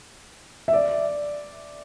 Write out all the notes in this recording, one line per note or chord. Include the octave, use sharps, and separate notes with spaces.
E5
D5